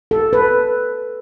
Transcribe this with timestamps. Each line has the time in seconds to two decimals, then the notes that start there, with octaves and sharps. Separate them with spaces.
0.11 A4
0.33 B4